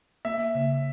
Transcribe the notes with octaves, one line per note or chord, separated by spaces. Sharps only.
A#3 E5
C#3